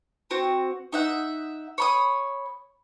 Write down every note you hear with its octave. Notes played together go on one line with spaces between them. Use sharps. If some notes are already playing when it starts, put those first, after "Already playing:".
C4 F#4
D#4 E5 F#5
C#5 B5 D#6